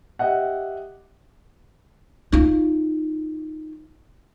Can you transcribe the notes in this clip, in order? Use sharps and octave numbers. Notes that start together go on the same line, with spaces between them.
G4 D#5 E5 F#5
D#4 F4